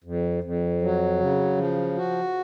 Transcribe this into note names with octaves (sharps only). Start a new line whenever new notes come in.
F2
F2
F#3
C#3
F3
F#4